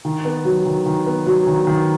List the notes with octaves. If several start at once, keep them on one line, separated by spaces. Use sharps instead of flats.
D#3
B3
F#3
D#3
D#3
B3
F#3
D#3
D#3